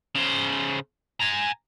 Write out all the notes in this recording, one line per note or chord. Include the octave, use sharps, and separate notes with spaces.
C#3 C5
G#5 A#5